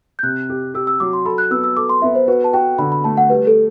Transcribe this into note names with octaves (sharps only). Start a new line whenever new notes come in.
G6
C3 F#6
G4
G4 E6
E6
F#3 D6
C6
A4 B5
F#6
B3 E6
E6
A4 D6
C6
B3 E5
C5
F#4 B4
A5
F#4 G5
D3 B5
B5
A3 A5
F#5
G3 B4
A4